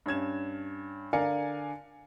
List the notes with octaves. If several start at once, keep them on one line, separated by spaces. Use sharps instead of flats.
G2 C#4 G#6 E7
D3 A#4 D5 F5 G#5 C#7